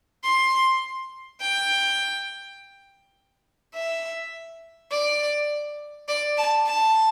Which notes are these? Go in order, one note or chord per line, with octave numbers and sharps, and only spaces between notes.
C6
G5
E5
D5
D5
A5
A5